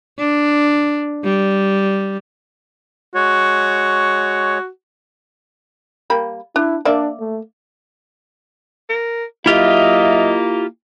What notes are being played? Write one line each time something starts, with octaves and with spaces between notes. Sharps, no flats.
D4
G3
G#3 F#4 C#5
G3 A#3 B5
D4 E4
A#3 D4 D5 E5
A3
A#4
F#3 A#3 E4 F4 G4 D#5 E5